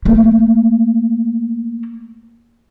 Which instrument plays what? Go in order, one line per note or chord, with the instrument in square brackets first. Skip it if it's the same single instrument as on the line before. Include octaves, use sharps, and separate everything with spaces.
[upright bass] A3 A#3